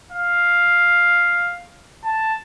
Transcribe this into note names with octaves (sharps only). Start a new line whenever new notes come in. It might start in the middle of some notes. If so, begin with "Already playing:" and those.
F5
A5